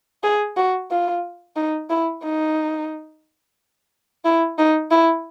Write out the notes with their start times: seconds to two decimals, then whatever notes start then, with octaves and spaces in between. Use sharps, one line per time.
0.23 G#4
0.57 F#4
0.91 F4
1.56 D#4
1.90 E4
2.23 D#4
4.25 E4
4.58 D#4
4.91 E4